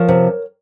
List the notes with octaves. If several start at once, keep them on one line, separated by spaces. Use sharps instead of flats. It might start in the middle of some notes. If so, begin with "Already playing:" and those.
Already playing: F3 A#4 C#5
C3